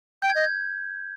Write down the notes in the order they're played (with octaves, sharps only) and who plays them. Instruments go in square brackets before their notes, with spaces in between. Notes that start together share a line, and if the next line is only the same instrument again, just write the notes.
[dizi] G5 [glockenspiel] G6
[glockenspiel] G#6
[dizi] D#5 [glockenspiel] G6
[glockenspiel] G#6